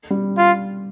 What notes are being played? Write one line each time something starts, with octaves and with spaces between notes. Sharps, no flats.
G3
F4